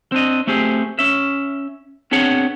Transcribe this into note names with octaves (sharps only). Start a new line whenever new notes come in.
C4 D4 D#5
A3 C4 G4 G#4
C#4 E5
B3 C4 D4 G#4 C#5 F#5